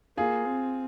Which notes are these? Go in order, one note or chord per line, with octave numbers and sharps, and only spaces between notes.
A#3 F4 G#4
C4